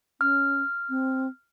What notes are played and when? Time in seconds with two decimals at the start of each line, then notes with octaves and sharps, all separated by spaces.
0.21 C#4 F6
0.89 C4